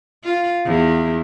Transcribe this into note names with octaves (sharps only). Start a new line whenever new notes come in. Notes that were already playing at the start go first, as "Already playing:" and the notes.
F4
E2